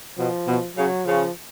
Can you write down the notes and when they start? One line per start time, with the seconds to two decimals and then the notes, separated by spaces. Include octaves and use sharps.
0.18 B2 F3
0.47 B2
0.77 C#3 F#3
1.06 C#3 F3